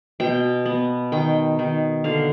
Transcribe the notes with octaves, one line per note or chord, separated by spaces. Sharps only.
B2 G5
B3
D#3 G5
D#3
D3 F5